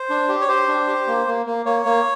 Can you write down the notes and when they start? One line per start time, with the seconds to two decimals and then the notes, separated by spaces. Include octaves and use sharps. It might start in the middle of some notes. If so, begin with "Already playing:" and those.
Already playing: C5
0.10 D4
0.29 G4
0.41 C#5
0.48 G4 C5
0.68 D4
0.87 G4
1.07 A#3
1.27 A#3
1.46 A#3
1.66 A#3 C#5
1.85 A#3